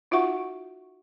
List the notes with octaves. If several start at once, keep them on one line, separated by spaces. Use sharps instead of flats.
D#4 F4 F#4 E5 F#5 C#6